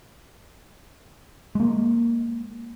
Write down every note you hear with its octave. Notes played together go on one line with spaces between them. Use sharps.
G#3 A#3